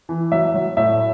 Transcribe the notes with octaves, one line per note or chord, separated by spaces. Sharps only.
E3
F#3 E5
F#3
A2 E5